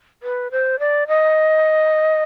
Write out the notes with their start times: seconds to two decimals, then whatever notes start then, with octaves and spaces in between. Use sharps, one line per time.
0.23 B4
0.51 C5
0.79 D5
1.08 D#5